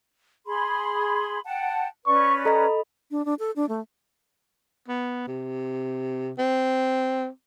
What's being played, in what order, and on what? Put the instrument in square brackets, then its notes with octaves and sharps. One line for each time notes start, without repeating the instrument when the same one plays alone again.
[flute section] G#4 B5 C6
F#5 G5 A5
[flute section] C#4 B4 D5 [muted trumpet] C#6
[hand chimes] A4 D#5 B5 [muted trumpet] A#5
[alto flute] D4
D4
A4
D4
A3
[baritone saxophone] B3
C3
C4